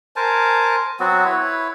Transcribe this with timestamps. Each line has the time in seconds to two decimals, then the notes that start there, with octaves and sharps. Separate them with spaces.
0.16 A#4 C5 G#5 A5
1.00 F#3 B3 C4 F#4
1.25 E4 B4 C#5